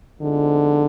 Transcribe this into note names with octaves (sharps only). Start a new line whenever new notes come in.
F2 D3 F3 G#3 B3 D#4